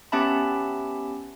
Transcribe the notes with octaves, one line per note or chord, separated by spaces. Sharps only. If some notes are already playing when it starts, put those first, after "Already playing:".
B3 C#4 G4 E5 A5 B5